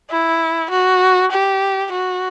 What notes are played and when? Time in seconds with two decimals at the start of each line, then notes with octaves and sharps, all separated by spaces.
0.10 E4
0.71 F#4
1.31 G4
1.92 F#4